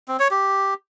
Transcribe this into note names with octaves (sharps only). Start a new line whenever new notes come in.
C4
C#5
G4